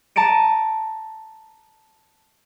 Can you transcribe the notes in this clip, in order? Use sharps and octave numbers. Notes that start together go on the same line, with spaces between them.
A5 A#5 D7 D#7